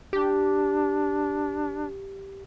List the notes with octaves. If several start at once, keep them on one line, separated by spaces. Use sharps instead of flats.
D4 G4